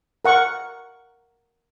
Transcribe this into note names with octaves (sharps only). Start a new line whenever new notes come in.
A#4 F#5 C#6